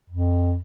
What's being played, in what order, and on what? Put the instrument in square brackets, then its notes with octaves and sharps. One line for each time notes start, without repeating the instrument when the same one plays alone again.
[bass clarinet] F2